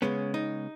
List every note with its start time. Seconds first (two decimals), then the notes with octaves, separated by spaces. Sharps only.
0.02 C#3 G#3 B3 C#4
0.34 D#4